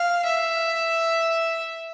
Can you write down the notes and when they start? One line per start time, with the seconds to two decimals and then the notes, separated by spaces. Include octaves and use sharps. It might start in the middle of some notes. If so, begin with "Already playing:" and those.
Already playing: F5
0.25 E5